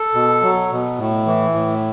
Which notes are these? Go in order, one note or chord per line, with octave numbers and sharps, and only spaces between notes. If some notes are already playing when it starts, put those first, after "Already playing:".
Already playing: A4
B2
F#3
B2
A2
E3
A2